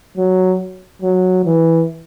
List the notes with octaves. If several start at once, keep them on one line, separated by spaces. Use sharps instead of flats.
F#3
F#3
E3